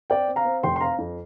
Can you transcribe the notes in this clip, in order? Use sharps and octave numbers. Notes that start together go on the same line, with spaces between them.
C4 D5 G5
C4
F5 A#5
C4
F1 G5 C6
C6
C4 F5 A#5
F2